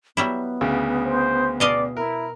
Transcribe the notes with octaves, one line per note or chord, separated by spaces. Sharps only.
F#3 G3 B3 E4
D2 C#3
C5
B2 D5 D#5 F5
E4 A#4